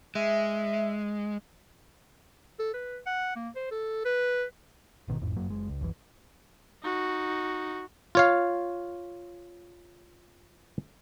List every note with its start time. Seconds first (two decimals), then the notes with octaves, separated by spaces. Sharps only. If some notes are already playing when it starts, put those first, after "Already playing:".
0.15 G#3 E5
2.59 A4
2.74 B4
3.06 F#5
3.36 A#3
3.56 C5
3.71 A4
4.05 B4
5.08 G#1 B2 D3 D#3
5.22 G#1 F2 A2
5.36 G#1 F#2 F#3 A#3
5.48 F#1 G#3
5.69 C#2
5.81 F#1 C2 F#2 E3
6.82 D#4 F#4
8.15 F4 C#5 F5